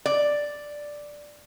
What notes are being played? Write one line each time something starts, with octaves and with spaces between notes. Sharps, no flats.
D5